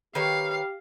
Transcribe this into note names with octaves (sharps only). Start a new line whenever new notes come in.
D#3 G4 B4 C#5 F5